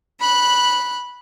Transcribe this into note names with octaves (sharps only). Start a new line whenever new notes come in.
B5 F#6